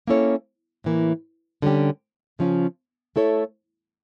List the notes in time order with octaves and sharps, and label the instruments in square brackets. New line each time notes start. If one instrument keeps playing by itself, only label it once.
[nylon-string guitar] A#3 C#4 E4 A4 C#5
A2 E3 A#3
D3 G3 C#4 G4
C#3 F3 C#4 F4
A3 E4 A4 C#5